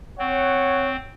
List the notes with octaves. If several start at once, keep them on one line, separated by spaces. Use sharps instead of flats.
C4 C#5 F#5